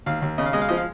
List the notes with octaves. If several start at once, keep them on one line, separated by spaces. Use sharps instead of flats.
D#2 F5
D#2
C#3 D#5
F5
G#3 D#5
F5
F3 D#5
F5